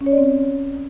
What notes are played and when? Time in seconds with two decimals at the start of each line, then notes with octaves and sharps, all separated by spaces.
0.01 C#4
0.06 C#5
0.12 D5
0.18 C4